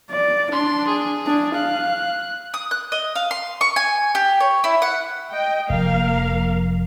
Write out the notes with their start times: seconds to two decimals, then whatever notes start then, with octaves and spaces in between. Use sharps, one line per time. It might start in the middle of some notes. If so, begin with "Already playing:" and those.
0.11 D5
0.52 D4 C6
0.88 G#4
1.26 D4
1.55 F5 F#6
2.54 D#6
2.71 F#6
2.92 D#5
3.15 F5
3.31 C6
3.61 C#6
3.76 G#5
4.15 G4
4.40 C#5
4.64 E4
4.82 F#5
5.32 D#5 G5
5.70 F1 F3 A#3 A#4 F5